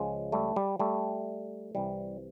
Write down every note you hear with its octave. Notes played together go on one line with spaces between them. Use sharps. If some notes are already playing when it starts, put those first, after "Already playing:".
Already playing: C#2 C#3 F3 G#3
G3 A3
G3
G3 A3
C2 C3 E3 G3